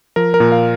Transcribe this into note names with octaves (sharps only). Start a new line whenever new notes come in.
F3 A#4
A#4
A#2
F5